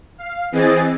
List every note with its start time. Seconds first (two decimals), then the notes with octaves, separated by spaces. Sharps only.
0.18 F5
0.52 E3 C4 G#4 D#5 A6